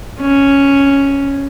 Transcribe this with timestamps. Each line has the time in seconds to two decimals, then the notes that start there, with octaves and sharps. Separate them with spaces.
0.21 C#4